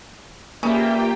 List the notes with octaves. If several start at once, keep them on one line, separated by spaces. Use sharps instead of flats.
C#3 A#3 F4 G4 B4 D5 E5 G5